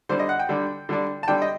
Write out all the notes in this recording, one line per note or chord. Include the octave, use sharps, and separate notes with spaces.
D3 G3 D4 C5
D#5
F#5
G5
D3 G3 D4
D3 G3 D4
A5
D3 G3 D4 G5
D#5